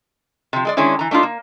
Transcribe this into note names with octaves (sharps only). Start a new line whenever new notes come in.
C3 F3
G#3 G#4 D5
D#3 G#3 C#4 D4 E4
E3 A#5
A3 D4 D#4 F4
A#3